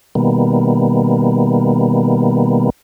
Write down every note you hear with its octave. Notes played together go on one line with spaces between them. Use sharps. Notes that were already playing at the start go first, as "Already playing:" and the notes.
B2 D#3 G3 A#3 B3